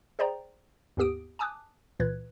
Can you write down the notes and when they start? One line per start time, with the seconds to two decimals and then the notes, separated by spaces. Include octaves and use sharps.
0.19 G#4 C5 D5 G5 A#5
0.97 D#2 G#2 B3 G4 D#6 D7
1.39 G#5 A5 D6 D#6 F#6
1.99 C#2 A#2 E3 B4 F#6 G#6